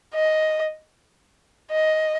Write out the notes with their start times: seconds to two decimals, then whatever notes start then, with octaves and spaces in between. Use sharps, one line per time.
0.15 D#5
1.71 D#5